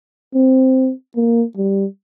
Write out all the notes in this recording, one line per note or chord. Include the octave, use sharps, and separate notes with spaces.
C4
A#3
G3